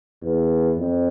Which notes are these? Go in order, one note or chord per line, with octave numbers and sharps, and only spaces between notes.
E2
F2